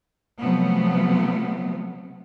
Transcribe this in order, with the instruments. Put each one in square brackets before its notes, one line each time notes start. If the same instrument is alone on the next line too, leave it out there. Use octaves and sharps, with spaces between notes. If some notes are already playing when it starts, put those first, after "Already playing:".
[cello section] C3 F3 F#3 A3 B3